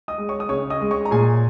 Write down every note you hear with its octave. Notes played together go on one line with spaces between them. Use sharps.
D#5 D#6
G#3
C#5 C#6
D#6
C#3 C#5 C#6
D#5 D#6
G#3
C#5 C#6
A#5
A#2 G#4 G#5